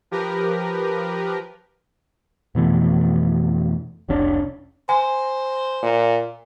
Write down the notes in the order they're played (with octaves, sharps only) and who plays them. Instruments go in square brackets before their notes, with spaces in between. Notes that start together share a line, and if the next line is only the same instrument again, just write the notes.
[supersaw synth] F3 G4 A#4 B4
[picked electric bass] F2 B2 E3 A3
F1 C2 C#4 D4
[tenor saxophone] C5 [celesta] G#5
[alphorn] A#2